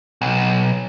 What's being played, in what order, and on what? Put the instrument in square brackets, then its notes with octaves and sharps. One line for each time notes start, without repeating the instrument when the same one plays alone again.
[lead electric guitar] B1